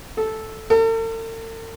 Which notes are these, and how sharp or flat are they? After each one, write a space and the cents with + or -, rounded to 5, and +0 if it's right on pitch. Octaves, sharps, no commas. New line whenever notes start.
A4 -5
A4 +45